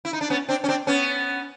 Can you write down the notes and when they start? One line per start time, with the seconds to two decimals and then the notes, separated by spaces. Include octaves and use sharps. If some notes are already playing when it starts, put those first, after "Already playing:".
0.05 E4
0.13 D#4
0.21 D4
0.30 B3 C#4
0.49 C4 D4
0.64 C#4
0.69 C4 D4
0.87 B3 C#4